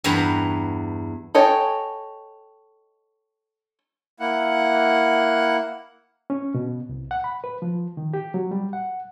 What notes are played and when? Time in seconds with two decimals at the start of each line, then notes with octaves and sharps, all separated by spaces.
0.04 E2 G2 B4 A#5
1.35 A4 C#5 D#5 G5 G#5
4.20 A#3 E4 F#5
6.30 C#4
6.55 B2
6.89 C2
7.11 F#5
7.24 B5
7.44 B4
7.62 F3
7.97 D#3
8.14 G4
8.34 F#3
8.51 G3
8.73 F#5